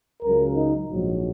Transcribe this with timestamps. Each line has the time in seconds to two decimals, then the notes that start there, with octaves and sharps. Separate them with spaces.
0.23 C#2 C#3 F#3 A#4
0.55 D#4
0.88 A#1 G#2 F#3